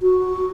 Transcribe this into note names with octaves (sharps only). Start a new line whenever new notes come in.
F#4